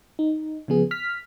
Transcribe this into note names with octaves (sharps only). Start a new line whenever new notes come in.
D#4
C#3 F3 B3 G#4
F6 B6